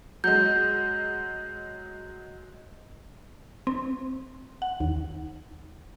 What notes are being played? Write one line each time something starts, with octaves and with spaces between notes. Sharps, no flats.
F#3 G#3 G6
C4
F#5
D#2